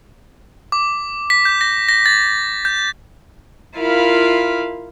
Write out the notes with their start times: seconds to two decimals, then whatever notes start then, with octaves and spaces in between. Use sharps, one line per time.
0.72 D6
1.30 B6
1.45 G6
1.61 A#6
1.89 A#6
2.06 A6
2.65 G6
3.75 E4 F4 A#4 F5 B5